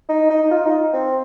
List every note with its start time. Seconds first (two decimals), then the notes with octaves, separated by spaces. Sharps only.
0.09 D#4
0.30 D#4
0.51 F4
0.66 D#4
0.93 C4